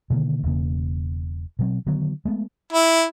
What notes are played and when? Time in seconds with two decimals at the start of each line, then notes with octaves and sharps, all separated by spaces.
0.10 B2 D3 D#3 A#3
0.43 E1 E2 C#3 A#3
1.59 B2 F#3 C4
1.86 D3 D#3 F#3 B3
2.25 G#3 A3 B3
2.73 E4